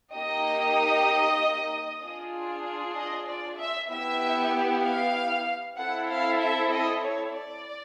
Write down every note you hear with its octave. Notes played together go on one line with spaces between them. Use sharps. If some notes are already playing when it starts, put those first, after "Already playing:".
A#3 D#4 G4 D#5
D4 F4 G#4
D#5
D5
E5
B3 E4 G4 E5
F5
C4 E4 A4 F#5
F5
E5
D#5
C#5
D5